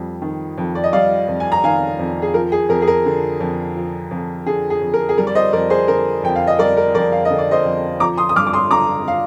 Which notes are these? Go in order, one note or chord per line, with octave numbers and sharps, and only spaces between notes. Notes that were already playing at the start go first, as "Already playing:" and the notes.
Already playing: F2 G3
D#3
F2
D5
D#5
G3 D5 F5
F2
G#5
A#5
D#3 F5 G#5
F2
G#4
F3 A#4
G#4
F2 A#4
G#4
A#4
D3
F2
F3
F2
D3 G#4
G#4
F2
A#4
G#4
G3 A#4
D5
C5 D#5
F2 A#4 D5
G#4 C5
D3 A#4
F2 G5
F5
D#5
G3 A#4 D5
A#4
F2 A#4 D5
F5
D3 D#5
D5
C5 D#5
F2
F3 A#5 D6
C6 D#6
D#6
G2 D6 F6
D6
C6 D#6
D3 A#5 D6
F5